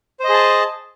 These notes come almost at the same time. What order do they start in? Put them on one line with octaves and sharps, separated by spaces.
C5 D#5 G#4 A5